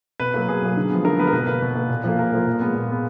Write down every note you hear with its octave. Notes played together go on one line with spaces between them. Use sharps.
B2 B4
F#3 A#3
B2 G#4
F#3 A#3
D3
F3 G#3 B3
D3 A#4
F3 G#3 B3 B4
A#4
B2 B4
A#3 B4
B2
A#3
A#2
F3 A#3
A#2 A#4
F3 A#3
A#2
G#3 B3
A#2
G#3 B3